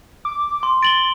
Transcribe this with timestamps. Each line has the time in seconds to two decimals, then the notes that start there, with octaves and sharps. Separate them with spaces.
0.25 D6
0.63 C6
0.82 A6 D7 F#7 G7